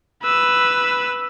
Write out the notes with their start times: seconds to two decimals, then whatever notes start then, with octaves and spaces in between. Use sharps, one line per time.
0.23 B4 E6